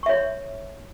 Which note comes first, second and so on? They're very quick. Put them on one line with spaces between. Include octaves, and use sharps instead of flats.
C#6 E5 C#5